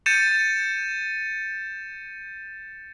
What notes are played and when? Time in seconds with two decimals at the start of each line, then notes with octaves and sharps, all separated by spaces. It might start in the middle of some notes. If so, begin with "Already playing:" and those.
0.06 G6 A6 C#7 D#7 E7